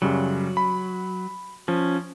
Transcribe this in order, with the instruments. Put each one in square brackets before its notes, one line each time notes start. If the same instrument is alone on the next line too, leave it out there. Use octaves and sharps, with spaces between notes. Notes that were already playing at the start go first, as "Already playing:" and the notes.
[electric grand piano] F#2 C#3 G3 [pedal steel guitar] F#3
[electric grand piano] B5
[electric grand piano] F3 [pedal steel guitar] C#4